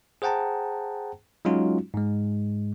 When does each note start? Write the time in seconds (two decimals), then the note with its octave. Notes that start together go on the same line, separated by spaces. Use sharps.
0.22 G#4 C5 F#5 G5 A5 A#5
1.45 F#3 G#3 C#4 D#4 F4 F#4
1.94 G#2 G#3